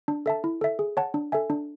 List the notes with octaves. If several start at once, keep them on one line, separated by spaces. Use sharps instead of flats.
D4
A4 E5 A5
E4
A4 E5
G#4
C#5 F#5 A5
D4
A4 E5 G#5
D4